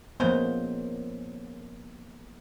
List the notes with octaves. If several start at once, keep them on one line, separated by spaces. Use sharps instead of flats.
C#3 F3 G#3 A#3 B3 C5